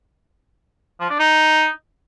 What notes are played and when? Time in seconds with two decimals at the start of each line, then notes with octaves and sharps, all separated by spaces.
1.01 F3
1.10 D4
1.19 D#4